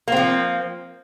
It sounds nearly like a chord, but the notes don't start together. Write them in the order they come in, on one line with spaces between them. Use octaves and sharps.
A#3 C4 F3